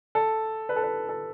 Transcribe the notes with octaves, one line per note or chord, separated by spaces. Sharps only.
A4
B4
A4
B4
A4